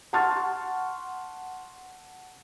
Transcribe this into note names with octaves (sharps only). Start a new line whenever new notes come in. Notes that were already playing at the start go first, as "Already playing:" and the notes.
F#5 A5 C6 C#6 F6 A6